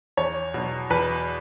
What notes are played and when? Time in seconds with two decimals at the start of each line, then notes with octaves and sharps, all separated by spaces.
0.17 E2 C#5
0.54 B2 F#3
0.90 E2 B4